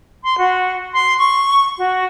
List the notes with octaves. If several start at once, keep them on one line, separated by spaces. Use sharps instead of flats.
C6
F#4
C6
C#6
F#4